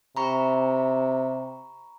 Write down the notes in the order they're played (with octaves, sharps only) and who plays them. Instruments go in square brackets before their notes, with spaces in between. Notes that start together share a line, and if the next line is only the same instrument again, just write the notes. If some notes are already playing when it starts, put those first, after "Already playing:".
[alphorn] C3 [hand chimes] A#5 B5 C#6